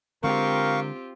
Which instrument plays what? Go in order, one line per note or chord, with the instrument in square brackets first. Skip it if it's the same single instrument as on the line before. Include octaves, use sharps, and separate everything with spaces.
[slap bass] D3 G#3 [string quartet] C4 F4 G4 [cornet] A#4 [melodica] F5 C#6